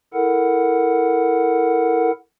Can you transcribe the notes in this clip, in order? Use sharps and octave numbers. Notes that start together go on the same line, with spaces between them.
E4 A4 A#4 F#5